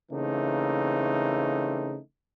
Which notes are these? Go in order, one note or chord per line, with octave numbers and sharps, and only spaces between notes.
C#3 E3 A3 A#3 C4 D#4